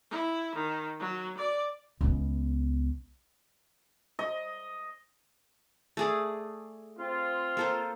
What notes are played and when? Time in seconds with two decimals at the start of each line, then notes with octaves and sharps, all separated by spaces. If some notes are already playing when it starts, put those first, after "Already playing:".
0.11 E4
0.55 D#3
0.99 F#3
1.37 D5
2.01 C#2 B3
4.19 D#5
5.97 A3 G#4 D5
6.98 C4 F4
7.57 A#3 A4 C5